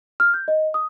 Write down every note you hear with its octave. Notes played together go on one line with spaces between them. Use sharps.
F6
G6
D#5
D#6